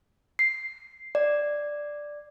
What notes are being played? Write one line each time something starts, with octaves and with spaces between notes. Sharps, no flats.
C7
D5